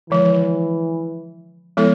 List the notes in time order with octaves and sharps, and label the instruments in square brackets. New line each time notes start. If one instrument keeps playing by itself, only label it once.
[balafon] D3 F3 G#3 [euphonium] E3
[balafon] F3 G#3 B3 E4 A4